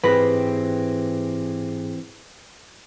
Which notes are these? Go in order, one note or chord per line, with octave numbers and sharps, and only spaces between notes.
G#2 E3 C4 G4 G#4 B4 A#6